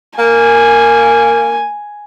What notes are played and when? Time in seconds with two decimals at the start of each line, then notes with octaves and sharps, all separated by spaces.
0.19 A#3 G#5